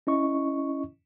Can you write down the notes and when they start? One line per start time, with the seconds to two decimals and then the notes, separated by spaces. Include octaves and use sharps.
0.07 C#4 E4 D#5 C#6